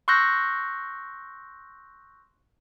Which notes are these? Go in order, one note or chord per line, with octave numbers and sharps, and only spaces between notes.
C6 C#6 E6 F#6 G6 A#6